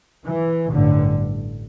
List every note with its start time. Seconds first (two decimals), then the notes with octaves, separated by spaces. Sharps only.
0.27 E3
0.71 A1 G2 D3